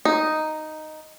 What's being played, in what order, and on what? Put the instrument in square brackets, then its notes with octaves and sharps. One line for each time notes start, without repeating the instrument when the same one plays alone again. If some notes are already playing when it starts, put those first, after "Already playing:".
[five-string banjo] D#4